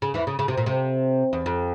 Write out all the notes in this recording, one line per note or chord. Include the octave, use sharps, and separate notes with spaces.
C#3
E2 E3
C#3
C#3
C3
A#2
C3
E2
F2